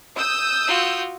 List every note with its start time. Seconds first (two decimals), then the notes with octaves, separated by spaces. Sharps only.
0.16 D#6 E6 G6
0.68 F4 F#4